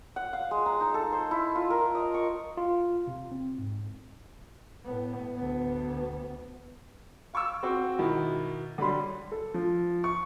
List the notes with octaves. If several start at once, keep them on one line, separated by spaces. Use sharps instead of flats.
F#5
F5
G#3
A#5
D#4
A4
C5
E4
F4
A#4
D#5
C#6
F4
C3
C4
G#2
A2 B3
D2 B3
F5 C#6 D6 E6
C4 F#4 C#6
B2 D#3 E4
D3 F#3 G3 B5 C6
A4
F3
C#6